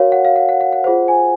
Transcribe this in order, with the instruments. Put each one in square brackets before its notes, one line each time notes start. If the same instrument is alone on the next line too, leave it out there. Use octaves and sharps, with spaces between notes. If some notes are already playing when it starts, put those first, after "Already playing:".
Already playing: [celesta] F#4 A#4 C#5 F5
F#5
F5
F#5
F#5
F#5
F#5
F4 G#4 C5 F#5
G#5